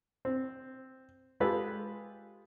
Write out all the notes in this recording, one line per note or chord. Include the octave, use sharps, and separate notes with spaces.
C4
G#3 F4 G4 A4 B4